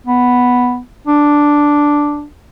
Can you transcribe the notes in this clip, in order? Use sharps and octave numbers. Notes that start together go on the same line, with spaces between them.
B3
D4